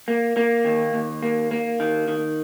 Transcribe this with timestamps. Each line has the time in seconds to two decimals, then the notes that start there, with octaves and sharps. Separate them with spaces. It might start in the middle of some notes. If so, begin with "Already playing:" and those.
0.08 A#3
0.37 A#3
0.65 D#2
0.94 D#2
1.23 A#3
1.51 A#3
1.80 D#3
2.08 D#3